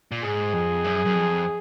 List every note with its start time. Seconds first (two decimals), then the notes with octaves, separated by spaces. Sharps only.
0.12 A#2
0.23 G#2 G#4
0.54 F2
0.84 F#2
1.05 F#2
1.14 F2